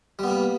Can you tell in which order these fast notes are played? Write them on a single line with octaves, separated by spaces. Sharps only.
G3 B3 A#3